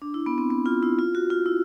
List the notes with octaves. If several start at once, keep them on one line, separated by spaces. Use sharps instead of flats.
D4
E4
B3
C4
B3
F4
E4
F4
F#4
F4
E4